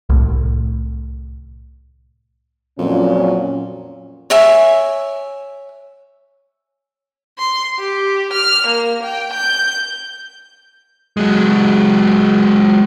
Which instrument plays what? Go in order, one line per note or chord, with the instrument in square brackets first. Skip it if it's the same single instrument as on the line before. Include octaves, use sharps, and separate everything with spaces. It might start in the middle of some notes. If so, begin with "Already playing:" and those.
[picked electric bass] C2 A2
[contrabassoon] F2 [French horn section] A#2 F#3 C#4
[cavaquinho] C#5 E5 G#5
[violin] C6
G4
F6
A#3
G5
G6
[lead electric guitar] F#3 G#3